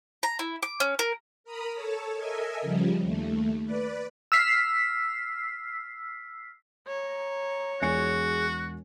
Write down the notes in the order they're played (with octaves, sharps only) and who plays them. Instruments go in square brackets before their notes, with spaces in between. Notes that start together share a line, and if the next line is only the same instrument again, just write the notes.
[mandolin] A#5
E4
D6
C#4
A#4
[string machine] A#4 A#5 B5 D#6
A4 C#5 A5
A4 A#4 D#5 E5 G#5
C#3 F3 G3
D#2 A3
B4 D5
[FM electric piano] E6 F6 B6 C7
[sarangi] C#5 [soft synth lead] A#5
[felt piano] E1 G#5 C#7 [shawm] F#4 [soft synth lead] G#4